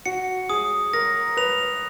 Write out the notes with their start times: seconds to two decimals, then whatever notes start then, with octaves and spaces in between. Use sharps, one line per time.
0.06 F#4 C#7
0.49 G#4 D#6
0.93 A#4 A#6
1.37 B4 F7